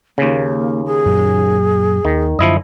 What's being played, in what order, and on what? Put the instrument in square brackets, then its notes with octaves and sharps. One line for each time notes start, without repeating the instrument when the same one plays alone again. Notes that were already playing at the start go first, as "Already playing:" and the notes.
[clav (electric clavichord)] D#2 C#3 [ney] A#3
[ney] G#4
[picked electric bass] F#2 A#2 F#3
[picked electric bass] D#2 [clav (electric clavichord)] D#3
[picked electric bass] F#2 D3 [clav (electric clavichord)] F3 E4 D#5